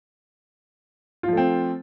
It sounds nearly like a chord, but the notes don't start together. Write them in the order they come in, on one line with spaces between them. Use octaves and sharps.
F4 F3 A3 C4